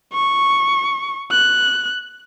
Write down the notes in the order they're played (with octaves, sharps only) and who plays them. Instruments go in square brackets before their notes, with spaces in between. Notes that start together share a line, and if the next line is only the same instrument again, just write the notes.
[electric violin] C#6
F#6